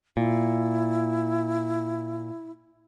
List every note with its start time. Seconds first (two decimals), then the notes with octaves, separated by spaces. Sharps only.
0.17 A#2 E4